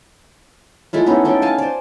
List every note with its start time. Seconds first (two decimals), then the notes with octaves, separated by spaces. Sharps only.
0.93 G#3 A3 E4 F4
1.06 B3 C#4 D#4 E4
1.25 C#4 A4 G5
1.42 F5 G#5 A5
1.58 C5 D5